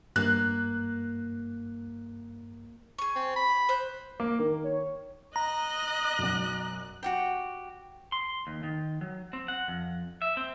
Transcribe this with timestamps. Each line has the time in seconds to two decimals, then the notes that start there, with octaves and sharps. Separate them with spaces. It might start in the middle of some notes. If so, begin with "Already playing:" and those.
0.16 G2 A#3 F#6
2.99 G#4 C#6
3.16 C4
3.36 B5
3.69 C5 F#6 G6
4.20 A#3 D6
4.39 D#3 A#4
4.64 C#5
5.36 D#5 A#5 F#6
6.19 B1 F#2
7.03 F#4 G4 G5
8.12 C6
8.47 D#2
8.63 D#3
9.01 F#3
9.33 C4
9.48 F#5
9.68 F2
10.22 E5
10.37 C4